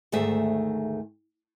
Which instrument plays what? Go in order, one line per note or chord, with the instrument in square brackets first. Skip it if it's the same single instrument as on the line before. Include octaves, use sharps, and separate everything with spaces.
[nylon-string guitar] D2 G#2 D#3 A3 G#4 E5